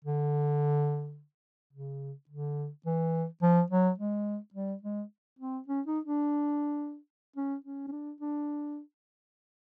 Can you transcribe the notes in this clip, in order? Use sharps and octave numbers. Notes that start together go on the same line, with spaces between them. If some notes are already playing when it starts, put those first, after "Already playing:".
D3
C#3
D3
E3
F3
F#3
G#3
G3
G#3
C4
C#4
D#4
D4
C#4
C#4
C#4
D4
D4